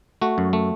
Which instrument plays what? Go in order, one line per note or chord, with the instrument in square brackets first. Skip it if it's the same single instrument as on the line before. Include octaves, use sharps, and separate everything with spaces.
[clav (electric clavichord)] A3 F#4
F#2
A3